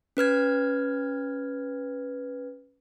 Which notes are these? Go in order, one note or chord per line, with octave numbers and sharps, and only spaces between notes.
C#4 B4 F6 G#6